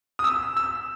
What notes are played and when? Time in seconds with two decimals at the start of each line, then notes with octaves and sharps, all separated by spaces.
0.19 D#6
0.24 E6
0.57 E6